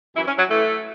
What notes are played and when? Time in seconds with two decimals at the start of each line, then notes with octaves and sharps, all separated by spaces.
0.15 F#2 E3 E4
0.26 C#4
0.38 F#3
0.49 A2 E3 A3